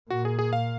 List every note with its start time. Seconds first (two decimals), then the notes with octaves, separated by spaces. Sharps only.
0.10 A#2 F#4
0.25 G#4
0.39 G#4
0.53 F5